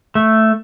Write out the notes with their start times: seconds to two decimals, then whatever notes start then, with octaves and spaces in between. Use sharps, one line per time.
0.15 A3